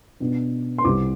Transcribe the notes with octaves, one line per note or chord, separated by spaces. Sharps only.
B2 B3 D4
C6
C2 C3 G3 D6